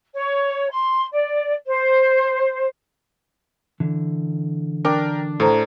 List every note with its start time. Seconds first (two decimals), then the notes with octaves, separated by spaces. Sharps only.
0.15 C#5
0.70 C6
1.12 D5
1.66 C5
3.80 D3 E3
4.85 D4 A#4 G5 D6
5.40 A2 A4 C5 A#5